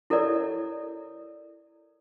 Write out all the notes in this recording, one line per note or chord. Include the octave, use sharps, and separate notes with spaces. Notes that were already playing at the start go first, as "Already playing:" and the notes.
E4 A4 A#4 C#5 D5